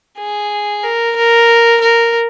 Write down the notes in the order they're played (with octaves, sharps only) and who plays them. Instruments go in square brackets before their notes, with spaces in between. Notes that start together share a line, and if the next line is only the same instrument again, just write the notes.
[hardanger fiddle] G#4
A#4
A#4
A#4